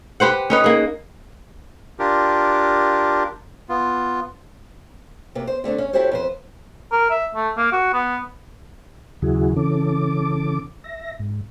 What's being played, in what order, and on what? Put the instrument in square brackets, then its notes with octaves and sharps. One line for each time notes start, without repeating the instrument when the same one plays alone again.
[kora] G4 B4 C5 F#5
C#4 D#4 B4
A#3 G#4
[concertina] D4 F4 G4 A#4
B3 F4
[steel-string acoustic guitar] C3 A#3 B3 F#4
C5
D3 A3 C4 D4
C#4
E4 F#4 G4 A4 C5 C#5
F2 B4 C5
[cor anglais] A#4
E5
A3
A#3
F#4
B3
[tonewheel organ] D#2 C#3 F#3 E4 F#4 G#4
C#3 E3 C#4 A4 D6
E5 A#6
G#2